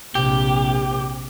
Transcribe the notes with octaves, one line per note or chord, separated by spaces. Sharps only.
A#1 C3 G4